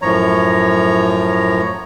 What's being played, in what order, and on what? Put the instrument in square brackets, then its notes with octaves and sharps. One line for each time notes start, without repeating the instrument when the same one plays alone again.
[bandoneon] F#2 A2 F3 C#5 A#5